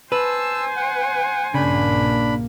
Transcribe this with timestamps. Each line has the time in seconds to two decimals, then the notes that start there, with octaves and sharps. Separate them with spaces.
0.12 B4 C5 G#5 A5 E6
0.76 F#5
1.54 A#1 G2 C#3 A#3 D4 B5